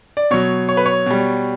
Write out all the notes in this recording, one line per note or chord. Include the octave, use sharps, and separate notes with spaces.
D5
B2 F#3 C#5
C#5
B4
C#5
B2 G3